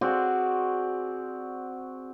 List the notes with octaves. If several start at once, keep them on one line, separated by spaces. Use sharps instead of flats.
C4 F#4 G#4 D5